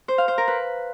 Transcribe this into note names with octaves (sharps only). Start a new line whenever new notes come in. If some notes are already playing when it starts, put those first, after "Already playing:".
C5
F5
C5
A#4
B4